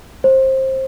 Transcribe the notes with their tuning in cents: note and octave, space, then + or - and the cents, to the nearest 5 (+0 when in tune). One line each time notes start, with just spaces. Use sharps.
C5 +20